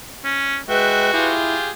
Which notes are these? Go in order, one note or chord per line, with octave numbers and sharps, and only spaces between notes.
C#4
G#3 F#4 B4 E5 G5
E4 F4 G4 G#4